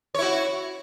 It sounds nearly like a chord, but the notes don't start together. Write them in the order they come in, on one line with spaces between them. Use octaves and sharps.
C#5 E4 F#4